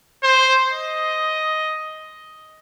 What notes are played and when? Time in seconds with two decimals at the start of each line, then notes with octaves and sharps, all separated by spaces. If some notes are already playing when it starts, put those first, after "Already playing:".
0.23 C5
0.72 D#5